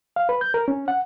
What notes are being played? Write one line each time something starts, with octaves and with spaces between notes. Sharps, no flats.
F5
B4
G6
A#4
C#4
F#5